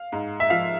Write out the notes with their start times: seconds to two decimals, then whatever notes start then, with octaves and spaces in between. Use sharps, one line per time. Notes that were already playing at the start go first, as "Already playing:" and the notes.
Already playing: F5
0.12 G#2
0.40 E5
0.50 F3 F5